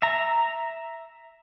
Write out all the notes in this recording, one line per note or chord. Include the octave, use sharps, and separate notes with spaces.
E5 A#5